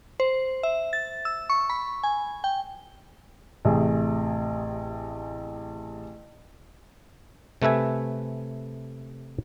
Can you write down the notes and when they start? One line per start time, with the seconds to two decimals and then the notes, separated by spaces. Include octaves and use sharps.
0.20 C5
0.63 E5
0.93 A6
1.25 E6
1.50 C#6
1.70 B5
2.03 G#5
2.44 G5
3.65 A1 C3 A3 G#4
7.62 C3 A3 B4 E5 G#5